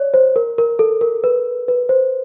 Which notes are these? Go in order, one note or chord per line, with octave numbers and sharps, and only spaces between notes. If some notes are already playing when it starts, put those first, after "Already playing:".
Already playing: C#5 D5
C5
A#4
A#4
A4
A#4
B4
B4
C5